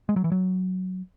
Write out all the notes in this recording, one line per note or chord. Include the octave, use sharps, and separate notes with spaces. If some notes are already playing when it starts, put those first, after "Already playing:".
G#3
F#3
E3
F#3